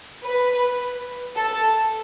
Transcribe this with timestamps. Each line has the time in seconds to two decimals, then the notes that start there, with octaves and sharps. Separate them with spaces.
0.24 B4
1.36 A4